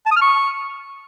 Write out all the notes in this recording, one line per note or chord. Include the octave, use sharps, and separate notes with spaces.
A5
D#6
F6
C#6